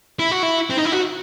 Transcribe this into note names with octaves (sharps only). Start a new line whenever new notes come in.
E4
F#4
E4
C4
D#4
E4
F#4